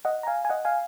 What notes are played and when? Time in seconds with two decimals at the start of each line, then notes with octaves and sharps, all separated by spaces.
0.05 D#5 F#5
0.23 A#5
0.27 F5 G#5
0.45 G#5
0.50 D#5 F#5
0.65 F5 G#5